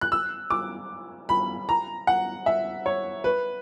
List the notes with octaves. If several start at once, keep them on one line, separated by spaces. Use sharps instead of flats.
F#6
E6
D6
B5
A#5
F#5
E5
C#5
B4